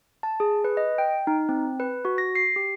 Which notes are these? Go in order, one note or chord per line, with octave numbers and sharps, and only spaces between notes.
A5
G#4
B4
D#5
G5
D#4
C4
B4
F#4
A#6
C7
G4